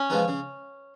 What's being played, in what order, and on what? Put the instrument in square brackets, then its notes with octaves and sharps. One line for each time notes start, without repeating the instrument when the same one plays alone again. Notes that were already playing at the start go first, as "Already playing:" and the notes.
Already playing: [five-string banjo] C#4
[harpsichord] F3 G#3 B3 D#4
C#3